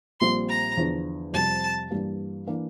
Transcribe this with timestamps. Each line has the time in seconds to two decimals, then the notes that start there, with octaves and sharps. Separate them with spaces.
0.20 A#1 A#2 G3 C4 C6
0.49 A#5
0.77 E2 D3 F3
1.33 F2 C3 G3 A5
1.91 G2 E3 G3 A#3
2.47 E3 A#3 D4